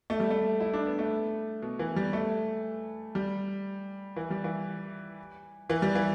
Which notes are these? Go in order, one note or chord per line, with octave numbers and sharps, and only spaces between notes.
A3
G3
A3
E4
D4
B3
A3
B2
E3
G3
A3
G3
E3
G3
E3
E3
G3
E3